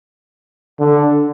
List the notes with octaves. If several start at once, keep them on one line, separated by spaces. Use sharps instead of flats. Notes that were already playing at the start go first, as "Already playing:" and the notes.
D3